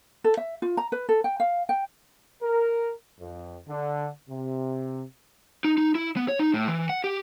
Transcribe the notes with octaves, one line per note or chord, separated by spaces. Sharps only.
A4
E5
F4
A#5
B4
A4
G5
F5
G5
A#4
F2
D3
C3
D#4
D#4
E4
B3
C#5
D#4
A2
E3
F#5
G4